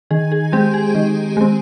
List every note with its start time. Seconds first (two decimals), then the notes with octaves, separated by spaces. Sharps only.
0.11 D#3 G#4
0.32 G#4
0.52 G#3 C4 G4
0.74 G#4
0.95 D#3
1.37 G#3 C4